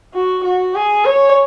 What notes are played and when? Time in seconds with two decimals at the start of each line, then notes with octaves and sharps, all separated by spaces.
0.14 F#4
0.44 F#4
0.75 G#4
1.06 C#5